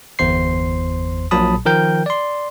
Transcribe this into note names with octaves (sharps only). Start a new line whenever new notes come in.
G1 E2 C5 C6 C7
A#1 A#2 F#3 A5 B5 D#6
D#3 F3 A#4 G5 G6
D5 C6